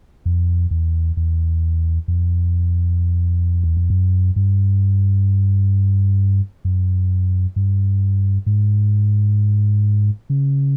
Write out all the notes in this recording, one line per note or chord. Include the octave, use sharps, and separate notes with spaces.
F2
E2
E2
F2
E2
F2
F#2
G2
F#2
G2
G#2
C#3